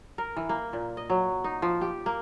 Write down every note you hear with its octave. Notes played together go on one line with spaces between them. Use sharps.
A#4
E3
A#3
A#2
D#5
F#3
D#4
F3
G4
A#3